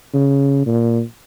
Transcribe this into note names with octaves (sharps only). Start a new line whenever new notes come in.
C#3
A#2